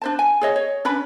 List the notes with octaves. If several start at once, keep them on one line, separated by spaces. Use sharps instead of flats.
D4 C5 A5
G#5
G#4 C#5 D#5
C#5
C#4 D4 B4 B5